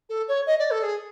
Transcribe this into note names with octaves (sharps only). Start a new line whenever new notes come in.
A4
C#5
D#5
D5
A4
G#4